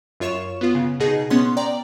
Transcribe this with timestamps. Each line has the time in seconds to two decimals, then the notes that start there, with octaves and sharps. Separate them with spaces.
0.20 F#2 F4 C#5 C#6 E7
0.61 B3 F4
0.75 C#3
1.00 B2 D#4 G#4
1.30 B3 C#4 C6
1.57 D5 G5 A#5